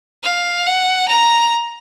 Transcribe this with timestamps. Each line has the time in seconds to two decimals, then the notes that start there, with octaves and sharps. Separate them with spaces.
0.23 F5
0.67 F#5
1.08 A#5